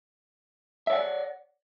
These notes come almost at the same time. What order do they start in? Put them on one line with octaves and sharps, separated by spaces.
E5 C#5 F#5 D5